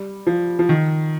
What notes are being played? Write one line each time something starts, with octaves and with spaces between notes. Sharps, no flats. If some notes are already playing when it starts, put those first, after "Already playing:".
Already playing: G3
F3
F3
D#3